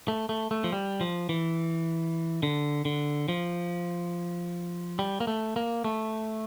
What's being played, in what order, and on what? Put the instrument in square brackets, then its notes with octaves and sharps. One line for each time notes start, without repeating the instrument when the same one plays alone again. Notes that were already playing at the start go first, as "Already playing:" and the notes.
[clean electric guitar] A3
A3
A3
F3
G3
F3
E3
D3
D3
F3
G3
A#3
A3
A#3
A3